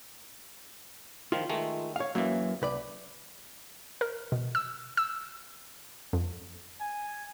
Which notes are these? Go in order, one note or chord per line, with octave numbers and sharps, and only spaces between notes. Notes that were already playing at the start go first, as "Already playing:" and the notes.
D#3 F3 F4
D#3 G#3 A3
C#5 F5
F#2 E3 F#3 A#3
C2 B4 D5
A#4
B2
E6
E6
F2
G#5